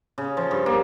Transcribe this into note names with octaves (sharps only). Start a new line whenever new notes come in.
C#3
F3
G2
A#3